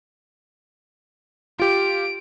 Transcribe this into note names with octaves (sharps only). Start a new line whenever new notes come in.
F4 G4 D7